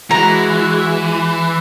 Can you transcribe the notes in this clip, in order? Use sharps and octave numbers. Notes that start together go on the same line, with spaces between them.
E3 G#3 F#4 A#5